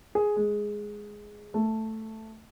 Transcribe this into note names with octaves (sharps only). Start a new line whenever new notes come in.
G#4
G#3
A3